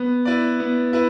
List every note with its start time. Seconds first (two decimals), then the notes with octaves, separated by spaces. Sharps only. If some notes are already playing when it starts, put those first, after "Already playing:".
Already playing: B3
0.25 E4 B4 D5
0.60 B3
0.93 E4 B4